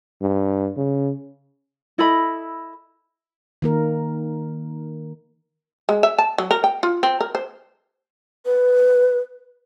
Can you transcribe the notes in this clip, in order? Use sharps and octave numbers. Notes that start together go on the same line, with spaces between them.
G2
C#3
E4 A4 D#5 B5
D#3 A#3 A#4
G#3
E5
A5
F#3
A#4
G5
F4
C4
A#4
C5
B4